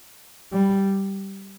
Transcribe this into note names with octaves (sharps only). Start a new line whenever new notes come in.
G3